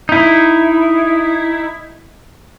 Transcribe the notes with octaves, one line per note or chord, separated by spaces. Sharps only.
D#4 E4